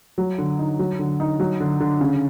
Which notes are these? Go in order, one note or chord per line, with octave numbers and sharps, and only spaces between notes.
F#3
D3
D#4
F#3
D3
D#4
F#3
D3
D3
C#3